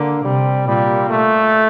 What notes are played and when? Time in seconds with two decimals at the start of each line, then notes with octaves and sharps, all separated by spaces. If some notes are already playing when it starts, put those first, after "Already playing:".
Already playing: D3 A#3
0.24 C3 G3
0.68 A#2 G3
1.10 A3